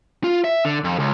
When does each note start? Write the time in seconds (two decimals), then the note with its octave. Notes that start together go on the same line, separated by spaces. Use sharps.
0.24 F4
0.44 E5
0.65 D3
0.84 F2
0.99 C#2